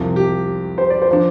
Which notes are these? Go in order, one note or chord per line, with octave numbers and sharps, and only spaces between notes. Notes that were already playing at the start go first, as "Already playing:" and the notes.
Already playing: C2 C3 F3
G4
C5
D5
C5
F3 D4